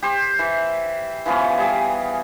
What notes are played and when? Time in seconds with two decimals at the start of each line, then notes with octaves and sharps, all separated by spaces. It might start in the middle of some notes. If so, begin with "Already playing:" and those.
0.02 G4 C5
0.39 E3
1.26 E3 F3 B3 C#4
1.57 G3 G#4